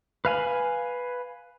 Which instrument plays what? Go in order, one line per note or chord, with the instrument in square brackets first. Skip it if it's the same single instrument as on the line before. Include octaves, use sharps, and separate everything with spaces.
[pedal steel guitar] B4 F5 G#5 B5